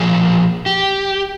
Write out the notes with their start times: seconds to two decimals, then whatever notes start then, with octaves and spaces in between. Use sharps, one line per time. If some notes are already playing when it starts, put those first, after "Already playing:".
Already playing: A#2 F3 G#4
0.66 G4